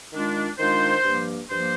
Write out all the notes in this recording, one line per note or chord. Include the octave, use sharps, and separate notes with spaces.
D#3 G#3 D4 F4
D#3 G#3 D4 F4 C5
G2 F3 A#3
G2 F3 A#3 C5